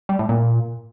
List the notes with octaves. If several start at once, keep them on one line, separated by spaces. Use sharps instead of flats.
G3
A2
A#2